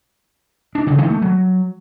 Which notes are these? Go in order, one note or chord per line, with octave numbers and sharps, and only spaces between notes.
D4
C#3
D#3
A3
F#3